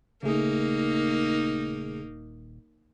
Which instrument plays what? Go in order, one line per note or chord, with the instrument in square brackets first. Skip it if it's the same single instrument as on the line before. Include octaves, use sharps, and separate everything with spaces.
[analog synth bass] D#1 [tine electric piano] C#3 A3 G#4 [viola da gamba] A#3 D#4